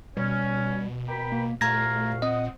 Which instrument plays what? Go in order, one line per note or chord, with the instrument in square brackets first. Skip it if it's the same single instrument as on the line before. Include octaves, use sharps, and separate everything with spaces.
[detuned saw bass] B2 [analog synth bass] G3 [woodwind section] C#4
[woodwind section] A#4 G5 B5
[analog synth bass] A#3
[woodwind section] C2 F#4 F5 [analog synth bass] A#2 [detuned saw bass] A3 [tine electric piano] A#5 G#6 A#6
[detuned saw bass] C4 [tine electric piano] D#5 [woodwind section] F#5 D#6